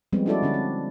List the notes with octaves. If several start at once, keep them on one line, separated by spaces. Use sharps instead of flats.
F3 G3 G#3 B3 C4
C#4 D4 E4 F#4 A4 D5
D3 C#4 D4
C4